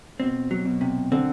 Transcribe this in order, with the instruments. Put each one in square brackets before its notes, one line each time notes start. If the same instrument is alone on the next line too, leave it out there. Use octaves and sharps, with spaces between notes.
[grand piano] B2 [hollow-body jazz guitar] C4
[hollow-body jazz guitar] F#3
[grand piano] B2
[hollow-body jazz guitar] C3
[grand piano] D3 [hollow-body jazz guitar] C4